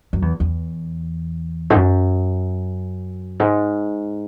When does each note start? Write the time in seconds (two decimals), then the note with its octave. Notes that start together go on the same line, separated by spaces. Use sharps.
0.13 F#2
0.22 E2
0.40 E2
1.70 G#2
1.76 F#2
3.40 G#2